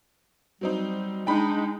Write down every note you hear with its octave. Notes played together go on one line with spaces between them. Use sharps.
F#3 G3 C4 D#4
G#3 D4 D#4 G5 B5